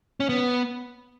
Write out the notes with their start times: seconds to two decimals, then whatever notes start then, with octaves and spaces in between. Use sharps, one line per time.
0.20 C#4
0.29 B3